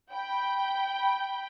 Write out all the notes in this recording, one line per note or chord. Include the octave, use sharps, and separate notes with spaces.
G5 B5